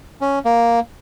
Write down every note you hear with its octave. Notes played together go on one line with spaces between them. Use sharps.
C#4
A#3